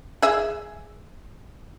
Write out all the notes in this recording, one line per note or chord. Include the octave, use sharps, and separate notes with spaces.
G#4 E5